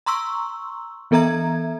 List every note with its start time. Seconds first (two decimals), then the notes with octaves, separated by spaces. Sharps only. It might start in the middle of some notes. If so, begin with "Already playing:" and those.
0.06 A#5 C6 C#6 E6
1.11 E3 B3 A4 E5 A#5 G#6